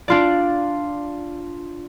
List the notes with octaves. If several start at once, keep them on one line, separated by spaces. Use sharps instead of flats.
D4 F4 D5